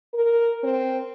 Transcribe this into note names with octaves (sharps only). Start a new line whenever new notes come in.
A#4
C4